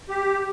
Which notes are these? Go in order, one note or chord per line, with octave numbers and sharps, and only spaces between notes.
G4